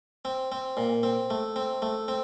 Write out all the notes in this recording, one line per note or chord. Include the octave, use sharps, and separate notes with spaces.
C4
C4
A#2
C4
A3
C4
A3
C4